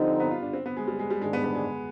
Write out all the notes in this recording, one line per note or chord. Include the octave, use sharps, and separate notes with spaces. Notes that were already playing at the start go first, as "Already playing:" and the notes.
Already playing: D3 F3 G3 C4 D#4
B3
F4
D4
C4
B3
G#3
G3
G#3
G3
G#2 D#3 G3 G#3 D4 G#4
B3
B3
G#3